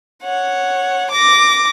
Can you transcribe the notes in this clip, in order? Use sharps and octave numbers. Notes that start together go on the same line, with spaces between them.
C#5 F#5
D6 A#6